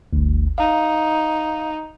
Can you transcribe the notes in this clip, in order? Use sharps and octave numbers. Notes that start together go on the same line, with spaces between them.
G1 D2
D#4 F5